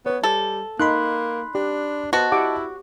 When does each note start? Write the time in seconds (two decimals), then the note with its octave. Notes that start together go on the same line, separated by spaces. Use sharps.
0.06 B3 B4 C#5
0.23 G3 A4
0.80 A#3 D#4 B5 C6 F#6
1.55 D4 G4
2.13 B3 F#4 C5 D#5 A5
2.32 E4 G4 F#5 D6